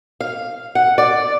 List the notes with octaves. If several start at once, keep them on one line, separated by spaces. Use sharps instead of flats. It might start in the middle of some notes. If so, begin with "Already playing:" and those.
F5
F#5
D5